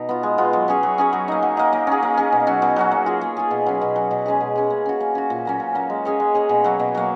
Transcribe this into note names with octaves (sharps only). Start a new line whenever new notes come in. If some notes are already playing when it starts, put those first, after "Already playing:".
Already playing: B2 D#4
B3 F4
G#3
B3 F4
F#3
C#4 G#4 C#5
F#3
C#4 G#4 C#5
F#3
A#3 D#4
F#3
A#3 D#4
A#3
C#4 G#4
A#3
C#4 G#4
B2
F#3 C#4 F#4
B2
F#3 C#4 F#4
A#3
F4 G#4
A#3
F4 G#4
B2
F#3 C#4
B2
F#3 C#4
B2
G#3 C#4 G#4
B2
G#3 C#4 G#4
A#3
C#4 F#4
A#3
C#4 F#4
A#2
F#3 A#3 C#4
A#2
F#3 A#3 C#4
G#3
C#4 G#4 C#5
G#3
C#4 G#4 C#5
B2
F#3 A#3
B2
F#3 A#3